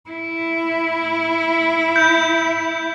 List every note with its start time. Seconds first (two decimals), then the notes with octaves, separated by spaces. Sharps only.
0.10 E4
1.96 G6